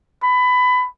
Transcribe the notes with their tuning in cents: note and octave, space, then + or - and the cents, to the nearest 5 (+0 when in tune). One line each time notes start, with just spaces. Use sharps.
B5 +20